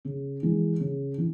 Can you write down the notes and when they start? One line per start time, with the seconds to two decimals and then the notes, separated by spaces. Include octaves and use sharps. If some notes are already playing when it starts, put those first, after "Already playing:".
0.05 C#3
0.43 E3 G#3
0.80 C#3
1.18 E3